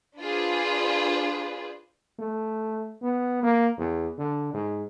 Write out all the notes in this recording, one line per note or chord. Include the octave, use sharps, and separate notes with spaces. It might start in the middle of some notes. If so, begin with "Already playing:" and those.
D4 F4 G#4 B4 C5
A3
B3
A#3
E2
D3
G#2